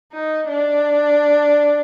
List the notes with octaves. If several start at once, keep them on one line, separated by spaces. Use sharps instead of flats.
D#4
D4